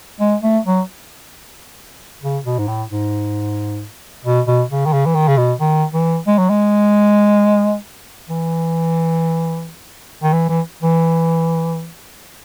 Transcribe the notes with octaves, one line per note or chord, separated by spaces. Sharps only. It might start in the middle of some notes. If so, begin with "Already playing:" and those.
G#3
A3
F#3
C#3
B2
G#2
A2
G#2
B2
B2
C#3
D#3
C#3
E3
D#3
C#3
B2
D#3
E3
G#3
F#3
G#3
E3
D#3
E3
E3
E3